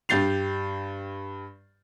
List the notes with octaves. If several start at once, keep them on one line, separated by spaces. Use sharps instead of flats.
G2 G4 G6 A6 C7 F7